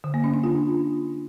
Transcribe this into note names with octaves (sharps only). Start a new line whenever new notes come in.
D3
A#3
C#4
D4
F4